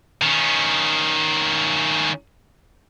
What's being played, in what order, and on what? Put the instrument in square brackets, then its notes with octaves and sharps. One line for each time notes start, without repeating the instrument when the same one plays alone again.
[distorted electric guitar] D#3 C#4